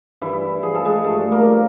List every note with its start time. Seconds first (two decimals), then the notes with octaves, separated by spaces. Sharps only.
0.21 G2 E3 E4
0.63 F3 G#4
0.75 A4
0.85 G#3 G#4
1.04 G2 A3 A4
1.31 A#3 A#4
1.45 F3